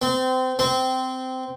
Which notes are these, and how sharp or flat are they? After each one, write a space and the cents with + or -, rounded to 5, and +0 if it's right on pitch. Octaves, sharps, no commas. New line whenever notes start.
C4 -25
C4 -15